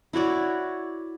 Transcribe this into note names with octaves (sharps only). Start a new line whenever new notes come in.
E4 F#4 C#5 D5